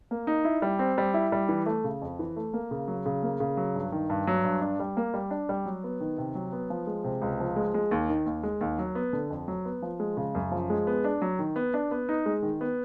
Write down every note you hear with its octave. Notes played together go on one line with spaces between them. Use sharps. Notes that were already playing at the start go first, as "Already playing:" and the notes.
A#3
D#4
E4
G3
C4
G3
E4
G3
E3
A3
C#3
F2
E3
A3
A#3
C#3
F#3
C#3
A#3
C#3
F#3
G2
D#3
G2
F#3
G2
D4
G3
A#3
G3
D4
G3
F#3
B3
D#3
C3
F#3
B3
F3
G#3
C3
C#2
F3
G#3
G#3
D#2
D#3
D#2
G#3
D#2
F#3
B3
D3
F2
F#3
B3
F3
G#3
C#3
F#2
F3
G#3
B3
D4
F#3
D#3
B3
D4
B3
D#4
G#3
D#3
B3